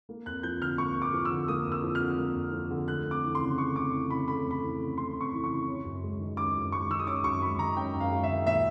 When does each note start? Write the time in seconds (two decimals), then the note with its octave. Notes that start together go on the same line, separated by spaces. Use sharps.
0.09 A#3
0.26 F2 F#6
0.43 F3 G6
0.61 D3 F6
0.78 A#3 C#6
0.96 F2
1.02 D6
1.13 F3
1.25 E6
1.31 D3
1.48 A#3 D#6
1.66 F2
1.72 E6
1.83 F3
1.95 F6
2.01 D3
2.18 A#3
2.36 F2
2.53 F3
2.71 D3
2.88 A3 F#6
3.06 F2
3.11 D6
3.23 E3
3.35 C6
3.41 C#3
3.58 A3 C#6
3.75 F2 D6
3.93 E3
4.10 C#3 B5
4.28 A3 B5
4.45 F2
4.51 B5
4.62 E3
4.80 C#3
4.98 A3 C6
5.15 F2
5.21 C#6
5.33 E3
5.44 C#6
5.50 C#3
5.67 C#4
5.85 F#2
6.02 G#3
6.20 D#3
6.37 C#4 D6
6.54 F#2
6.72 G#3 C#6
6.89 D#3 E6
6.99 D#6
7.07 C#4 D6
7.24 F#2 C#6
7.42 G#3 B5
7.59 D#3 A#5
7.77 C#4 G5
7.94 F#2
8.00 F5
8.11 G#3
8.23 E5
8.29 D#3
8.47 A#2 E5